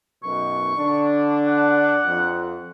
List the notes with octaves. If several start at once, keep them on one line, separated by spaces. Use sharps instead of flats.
B1 F#2 B2 C#6
D3 D4
F#5
F2